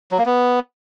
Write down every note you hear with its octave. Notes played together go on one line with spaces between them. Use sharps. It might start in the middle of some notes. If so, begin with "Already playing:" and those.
F#3
A#3
B3